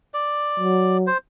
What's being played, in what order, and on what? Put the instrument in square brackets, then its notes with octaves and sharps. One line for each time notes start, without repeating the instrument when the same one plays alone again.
[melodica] D5
[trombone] F#3
[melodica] C5